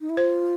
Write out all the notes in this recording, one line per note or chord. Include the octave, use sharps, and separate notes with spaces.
D#4
E4
F4 C5